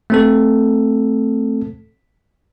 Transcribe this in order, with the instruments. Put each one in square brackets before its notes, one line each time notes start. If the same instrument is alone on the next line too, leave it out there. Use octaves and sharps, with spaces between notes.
[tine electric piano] A3 C4 A4